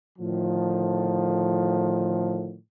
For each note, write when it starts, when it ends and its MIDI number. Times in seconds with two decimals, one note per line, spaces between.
0.19 2.57 45
0.19 2.57 50
0.19 2.57 51
0.19 2.57 53